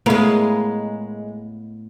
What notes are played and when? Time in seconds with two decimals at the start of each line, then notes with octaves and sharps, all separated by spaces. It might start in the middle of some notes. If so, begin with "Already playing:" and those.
0.06 A2 G#3 B3 A#4 F5